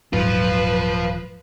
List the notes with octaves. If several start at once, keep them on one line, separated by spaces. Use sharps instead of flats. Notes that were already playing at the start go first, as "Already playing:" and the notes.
D#1 G#2 F3 F#3 F4 B4